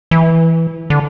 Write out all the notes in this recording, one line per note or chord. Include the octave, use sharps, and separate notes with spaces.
E3
D3